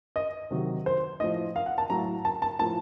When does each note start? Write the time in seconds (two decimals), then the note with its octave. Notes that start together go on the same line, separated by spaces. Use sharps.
0.16 D#5
0.51 C3 D#3 F#3
0.86 C5
1.20 A2 F3 D#5
1.56 F5
1.66 F#5
1.78 A5
1.90 A2 F#3 A#5
2.25 A5
2.42 A5
2.59 A2 F3 A5